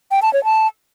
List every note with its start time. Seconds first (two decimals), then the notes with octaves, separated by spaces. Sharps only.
0.11 G5
0.22 A5
0.33 C#5
0.44 A5